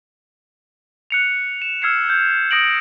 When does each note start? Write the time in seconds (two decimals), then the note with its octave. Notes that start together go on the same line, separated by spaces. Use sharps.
1.10 F#6 C#7 F7
1.62 E7
1.82 E6 F6 G#6 C7 C#7 E7
2.09 G6
2.51 D#6 A#6 D7 F#7